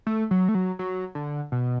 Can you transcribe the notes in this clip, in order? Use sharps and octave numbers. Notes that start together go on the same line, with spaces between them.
A3
F#3
A3
F#3
F#3
D3
B2